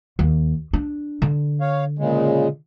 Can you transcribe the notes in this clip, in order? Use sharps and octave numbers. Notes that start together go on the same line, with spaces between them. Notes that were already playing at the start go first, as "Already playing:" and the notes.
D#2
D4
D3
C#5 F5
A#2 C#3 G#3